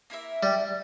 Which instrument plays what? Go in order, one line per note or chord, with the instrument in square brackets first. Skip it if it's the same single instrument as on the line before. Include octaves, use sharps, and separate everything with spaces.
[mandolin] A#3 E4 A#4 E5
[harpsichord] G3